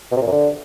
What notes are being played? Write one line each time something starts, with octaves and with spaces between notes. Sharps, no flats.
B2
C3
A#2
F#2
D3